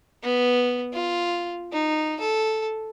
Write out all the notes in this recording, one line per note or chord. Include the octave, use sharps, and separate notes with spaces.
B3
F4
D#4
A4